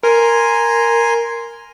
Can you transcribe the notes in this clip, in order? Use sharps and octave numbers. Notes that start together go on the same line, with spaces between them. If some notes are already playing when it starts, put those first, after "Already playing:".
A#4 G#5 A#5 C6